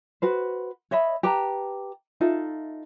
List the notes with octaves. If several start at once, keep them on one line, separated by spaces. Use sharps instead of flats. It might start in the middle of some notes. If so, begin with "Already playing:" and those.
F#4 B4 C5
C#5 D#5 E5 B5
G4 B4 A5 A#5
D#4 F4 A4 E5